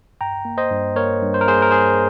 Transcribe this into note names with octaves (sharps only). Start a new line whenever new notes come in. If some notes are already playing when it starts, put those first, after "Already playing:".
G2 G5 A#5
A#3
C5 D#5
G2
A#3 A#4 C#5
G2
C5
A#4
A#3 G#4 C5
A#4
G2 G#4 C5